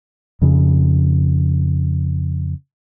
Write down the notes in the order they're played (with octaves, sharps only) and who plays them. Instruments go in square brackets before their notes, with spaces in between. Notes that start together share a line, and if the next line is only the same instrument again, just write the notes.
[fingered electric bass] F2 C#3